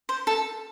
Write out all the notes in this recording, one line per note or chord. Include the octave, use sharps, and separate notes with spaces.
C5
A4